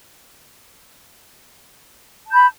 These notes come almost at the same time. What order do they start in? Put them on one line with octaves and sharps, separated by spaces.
A5 G6 B5